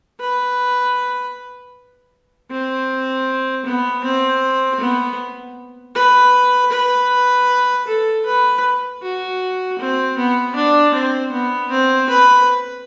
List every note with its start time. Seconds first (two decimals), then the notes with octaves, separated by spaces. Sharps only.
0.20 B4
2.51 C4
3.66 B3
4.04 C4
4.80 B3
5.95 B4
6.72 B4
7.87 A4
8.26 B4
9.02 F#4
9.79 C4
10.17 B3
10.56 D4
10.94 C4
11.32 B3
11.71 C4
12.09 B4